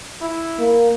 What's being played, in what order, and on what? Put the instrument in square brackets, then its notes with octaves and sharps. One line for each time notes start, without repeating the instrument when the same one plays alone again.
[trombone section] E4
[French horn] A#3